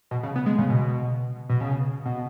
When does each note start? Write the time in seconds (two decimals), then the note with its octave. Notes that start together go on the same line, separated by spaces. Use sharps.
0.11 B2
0.23 C#3
0.36 B3
0.46 G#3
0.58 C#3
0.70 B2
1.49 B2
1.60 C#3
2.06 B2